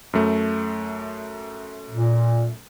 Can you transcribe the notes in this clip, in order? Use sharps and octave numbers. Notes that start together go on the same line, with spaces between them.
F#2 A3
A#2